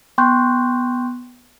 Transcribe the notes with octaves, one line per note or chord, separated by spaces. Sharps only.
B3 G5 C6 C#6 F#6 G6